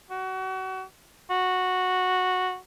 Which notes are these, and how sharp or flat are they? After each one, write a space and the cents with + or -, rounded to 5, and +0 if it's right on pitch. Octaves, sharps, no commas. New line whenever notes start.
F#4 +30
F#4 -10